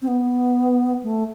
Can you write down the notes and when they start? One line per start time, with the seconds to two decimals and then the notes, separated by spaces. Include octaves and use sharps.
0.02 C4
0.08 B3
1.03 A3